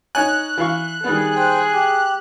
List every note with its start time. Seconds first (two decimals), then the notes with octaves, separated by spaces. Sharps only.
0.15 D#4 C#5 G#5 F#6
0.58 E3 F5 C#6
1.04 D#3 G3 B3 G#4
1.36 C5 G5
1.73 G4